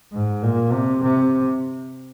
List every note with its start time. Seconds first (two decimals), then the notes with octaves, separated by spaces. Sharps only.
0.12 G#2
0.42 A#2
0.72 C3
1.02 C3